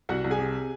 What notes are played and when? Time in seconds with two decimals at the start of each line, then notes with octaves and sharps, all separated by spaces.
0.09 C2 F#4 F#5
0.24 C2
0.30 G#4 G#5
0.38 C3